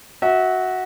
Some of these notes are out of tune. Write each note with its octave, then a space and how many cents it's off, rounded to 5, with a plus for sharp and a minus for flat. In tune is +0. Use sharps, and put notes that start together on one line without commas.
F#4 +0 E5 -30